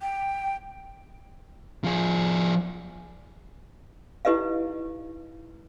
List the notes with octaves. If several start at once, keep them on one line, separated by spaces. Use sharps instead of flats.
G5
F3 G#4
D#4 E4 G4 B4 D#5 F5